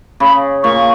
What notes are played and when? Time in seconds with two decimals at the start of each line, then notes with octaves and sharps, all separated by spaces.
0.20 C#3 B5
0.63 A#2 C#6